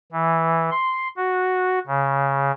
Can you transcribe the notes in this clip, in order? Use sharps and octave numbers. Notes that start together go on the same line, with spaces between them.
E3
C6
F#4
C#3